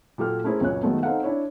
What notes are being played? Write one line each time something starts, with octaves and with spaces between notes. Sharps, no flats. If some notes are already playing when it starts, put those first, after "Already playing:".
A#2 F#3 G4 A4 F6
A3 C#4 E4 G#4 A#4 C5
C#2 F#2 A#2 C#5 G#5 F#6
D#3 F#3 G#3 A3 B3
C4 D#4 A4 F5 F#5
D4 E4 C#5